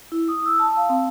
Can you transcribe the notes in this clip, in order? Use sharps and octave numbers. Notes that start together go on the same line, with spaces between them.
E4
D#6
E6
A5
F5
C4